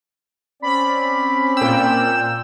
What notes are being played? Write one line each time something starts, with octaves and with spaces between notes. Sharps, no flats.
C4 C#4 D5 B5
A#2 G5 E6